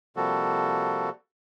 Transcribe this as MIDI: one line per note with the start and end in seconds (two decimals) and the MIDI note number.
0.16 1.10 48
0.16 1.10 53
0.16 1.10 55
0.16 1.10 58
0.16 1.10 66
0.16 1.10 69